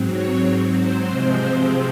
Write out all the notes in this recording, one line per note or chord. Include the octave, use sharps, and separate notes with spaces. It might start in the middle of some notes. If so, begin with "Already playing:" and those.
Already playing: G#2 F#3 C4
C#5
C5
C3 F3 G#3 C4